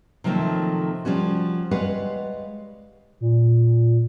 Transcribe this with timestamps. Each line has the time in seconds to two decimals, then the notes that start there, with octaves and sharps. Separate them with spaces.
0.24 C3 D#3 F3 F#3 A3 A#3
1.05 F3 G3 C#4 F#4
1.71 G3 G#3 B4 C#5 F5 F#5
3.21 A#2